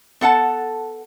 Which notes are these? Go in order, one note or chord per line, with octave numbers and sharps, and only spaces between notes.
B3 A4 F#5 A5